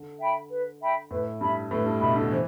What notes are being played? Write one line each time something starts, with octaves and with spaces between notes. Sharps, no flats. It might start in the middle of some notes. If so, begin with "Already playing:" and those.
Already playing: D3
E5 G5 B5
B4
E5 G5 B5
A2 B4
G2 E5 B5
A2 B4
G2
B2 E5 B5
D3
E3 C5